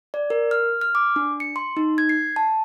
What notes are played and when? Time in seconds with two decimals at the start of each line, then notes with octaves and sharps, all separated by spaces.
0.14 D5
0.30 A#4
0.51 F6
0.81 F6
0.95 D6
1.16 D4
1.40 C#7
1.56 C6
1.77 D#4
1.98 G#6
2.09 C7
2.36 A5